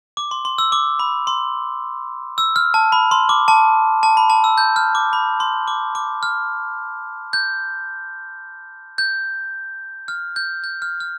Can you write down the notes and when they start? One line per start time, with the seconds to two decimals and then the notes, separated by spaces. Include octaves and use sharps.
0.17 D6
0.31 C6
0.45 C6
0.58 E6
0.72 D6
0.99 B5
1.27 C6
2.38 E6
2.56 F6
2.74 A5
2.92 B5
3.11 C6
3.29 D6
3.48 A5
4.03 A5
4.17 B5
4.30 A5
4.44 E6
4.58 G6
4.76 F6
4.95 D6
5.13 B5
5.40 C6
5.68 D6
5.95 D6
6.23 F6
7.33 G6
8.98 G6
10.08 F6
10.36 G6
10.64 G6
10.82 F6
11.00 F6